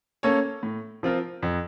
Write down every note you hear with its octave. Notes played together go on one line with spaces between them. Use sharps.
A#3 C#4 A4 C#5
A2
F3 C4 F4 A#4
F2